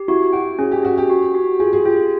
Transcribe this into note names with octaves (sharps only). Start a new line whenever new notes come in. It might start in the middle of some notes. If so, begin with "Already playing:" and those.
Already playing: G4
E4 F#4
F#4 G5
C#4 G#4
G4
C#4 F#4
G4
F#4
F#4
F4 G#4
G#4
F4 G4